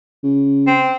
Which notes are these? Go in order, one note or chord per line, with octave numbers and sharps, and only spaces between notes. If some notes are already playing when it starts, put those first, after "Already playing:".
C#3
C4